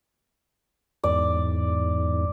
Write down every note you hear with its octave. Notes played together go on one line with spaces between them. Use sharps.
E2 G#2 D5